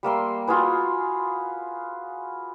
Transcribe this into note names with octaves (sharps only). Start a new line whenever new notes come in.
G3 A#3 E5 C6
F4 F#4 G#4 B4